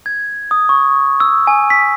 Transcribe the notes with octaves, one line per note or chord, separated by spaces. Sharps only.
G#6
D#6
C#6
E6
G#5
B6